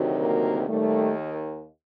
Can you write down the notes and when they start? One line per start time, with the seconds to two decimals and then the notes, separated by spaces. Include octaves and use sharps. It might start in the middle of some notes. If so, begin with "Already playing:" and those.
Already playing: D2 C3 D#3 F#3
0.20 A#3
0.68 D#2 D#3 G3 A3